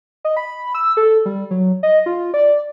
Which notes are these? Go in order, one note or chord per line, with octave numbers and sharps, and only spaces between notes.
D#5
B5
E6
A4
G3
F#3
D#5
F4
D5